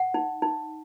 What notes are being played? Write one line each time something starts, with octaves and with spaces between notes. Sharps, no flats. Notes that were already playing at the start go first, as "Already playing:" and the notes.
Already playing: F#5
D#4
D#4